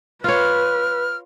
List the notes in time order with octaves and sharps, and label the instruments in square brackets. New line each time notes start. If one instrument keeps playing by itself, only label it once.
[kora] F4 C#5 [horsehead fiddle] B4 [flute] F6